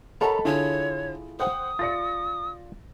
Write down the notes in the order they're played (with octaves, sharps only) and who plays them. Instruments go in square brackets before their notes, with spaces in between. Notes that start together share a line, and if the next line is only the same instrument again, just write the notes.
[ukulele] A4 [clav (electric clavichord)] A#4 C#5 E5 [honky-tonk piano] D#5 F#5 B5 [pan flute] A#5
[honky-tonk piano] D3 [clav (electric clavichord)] E4 F4 G#4 [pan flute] C#5
[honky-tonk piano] C5 F#5 G5 [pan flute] D#6
[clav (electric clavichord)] F4 D5 [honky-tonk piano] A6 A#6 C#7